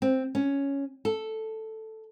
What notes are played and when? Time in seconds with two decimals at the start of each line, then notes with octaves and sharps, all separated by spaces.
0.02 C4
0.35 C#4
1.05 A4